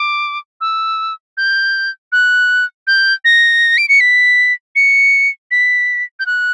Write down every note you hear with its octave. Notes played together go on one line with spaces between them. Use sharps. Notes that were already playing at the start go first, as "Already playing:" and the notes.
Already playing: D6
E6
G6
F#6
G6
A#6
D7
C#7
B6
C#7
B6
G6
F#6